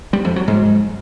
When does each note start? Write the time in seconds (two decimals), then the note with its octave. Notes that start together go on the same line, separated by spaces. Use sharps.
0.13 G3
0.25 F2
0.36 F#3
0.48 G#2